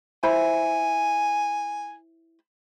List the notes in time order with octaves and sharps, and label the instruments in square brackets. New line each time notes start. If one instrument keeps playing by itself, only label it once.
[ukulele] E4 C5 B5 [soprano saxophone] G#5